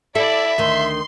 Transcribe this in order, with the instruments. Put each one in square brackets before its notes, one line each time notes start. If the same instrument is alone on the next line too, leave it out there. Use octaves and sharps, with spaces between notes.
[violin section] E4 D5 [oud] A4 [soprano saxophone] E5
[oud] D2 D#3 [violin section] C6